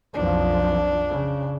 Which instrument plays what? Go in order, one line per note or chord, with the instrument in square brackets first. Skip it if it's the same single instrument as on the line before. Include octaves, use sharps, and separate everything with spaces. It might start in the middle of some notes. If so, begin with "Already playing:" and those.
[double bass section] B1 F2 F3 [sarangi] D4
[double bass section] C#3